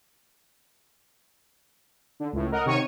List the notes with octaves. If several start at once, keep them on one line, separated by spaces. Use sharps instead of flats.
D3
C#2 A2
A#4 D#5 F#5
C3 D#3 C#5 C#6 C#7 D#7